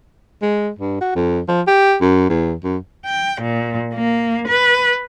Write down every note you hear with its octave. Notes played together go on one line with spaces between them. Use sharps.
G#3
G2
F#4
F2
F3
G4
F#2
E2
F#2
G5
A#2
A#3
B4